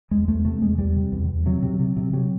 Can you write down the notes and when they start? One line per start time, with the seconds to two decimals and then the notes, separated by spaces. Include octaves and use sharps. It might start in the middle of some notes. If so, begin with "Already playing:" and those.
0.11 E2 G#3
0.28 E2 A3
0.45 C3 A3
0.62 E2 G#3
0.78 E2 G3
0.96 C3
1.12 E2
1.29 E2
1.46 C3 F#3
1.63 C3
1.79 C3
1.97 C3
2.13 C3 F#3